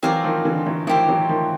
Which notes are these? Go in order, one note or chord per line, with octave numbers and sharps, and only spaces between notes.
E3 F#3 C4 F4 A#4 D5
D#3 F3
D3 E3
E3 F#3
D#3 F3 E4 G4 C5
E3 F#3
D#3 F3